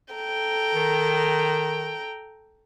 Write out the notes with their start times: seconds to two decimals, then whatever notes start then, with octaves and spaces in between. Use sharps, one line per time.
0.14 A4 G5 A#5
0.75 D#3